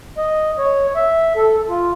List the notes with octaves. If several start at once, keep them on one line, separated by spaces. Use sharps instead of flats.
D#5
C#5
E5
A4
F4